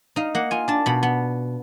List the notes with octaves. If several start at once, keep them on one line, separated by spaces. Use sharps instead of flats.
D#4 F5
A#3 F#5
F4 G#5
D4 A5
B2 B5
B3